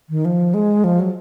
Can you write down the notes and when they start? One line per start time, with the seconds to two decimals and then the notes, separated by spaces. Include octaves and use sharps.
0.10 D#3
0.25 F3
0.54 G#3
0.84 F3
1.00 F#3